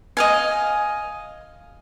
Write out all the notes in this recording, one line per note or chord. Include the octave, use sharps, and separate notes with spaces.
D#5 F5 G#5